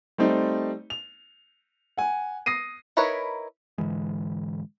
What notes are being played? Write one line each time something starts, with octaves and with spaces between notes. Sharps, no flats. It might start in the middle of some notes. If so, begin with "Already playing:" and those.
G3 A3 C4 D#4
F7
F#5 G#5
D#6 A#6 C7 D#7
D#4 E4 A#4 B4 C#5
G#2 D3 E3 G#3